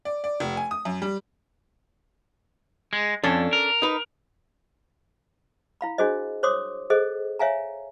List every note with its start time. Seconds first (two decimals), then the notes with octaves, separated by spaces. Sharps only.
0.05 D5
0.24 D5
0.40 F1
0.57 G#5
0.71 D#6
0.85 F#2
1.02 G3
2.93 G#3
3.24 F2 C#4 D4 A4
3.53 A#4
3.82 D#4 B4
5.81 E4 F5 B5
5.98 D4 F#4 G#4 C5 D#5
6.43 C5 C#5 C6 D6 D#6
6.90 G#4 A4 C5 D#5
7.39 C#5 E5 F5 G#5 A#5